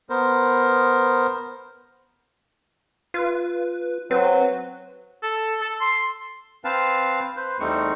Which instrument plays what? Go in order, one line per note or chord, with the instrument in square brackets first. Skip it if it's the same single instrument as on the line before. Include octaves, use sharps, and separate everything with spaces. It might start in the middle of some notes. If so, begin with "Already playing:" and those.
[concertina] B3 A#4 C5
[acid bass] F4 [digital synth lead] B4
[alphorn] F#3 [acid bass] C4 [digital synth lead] B4
[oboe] A4
A4
C6
[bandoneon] C4 B4 F5 A5
B4 C5
E2 G3 A3 C4 D#4 C#6